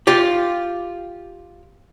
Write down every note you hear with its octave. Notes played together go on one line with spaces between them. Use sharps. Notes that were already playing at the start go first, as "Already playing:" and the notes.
F4 G4